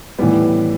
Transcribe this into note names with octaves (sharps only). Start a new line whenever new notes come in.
A2 E3 G3 B3